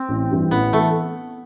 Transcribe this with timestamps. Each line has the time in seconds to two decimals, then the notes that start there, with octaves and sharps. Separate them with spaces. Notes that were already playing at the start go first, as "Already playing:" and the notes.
Already playing: C4
0.09 A1
0.30 G2 E3
0.51 A1 B3
0.73 E3 A3